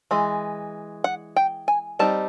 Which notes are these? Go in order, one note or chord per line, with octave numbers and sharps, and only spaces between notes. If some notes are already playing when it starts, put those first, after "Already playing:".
E3 G#3
F#5
G5
G#5
G3 C4 D#4 A5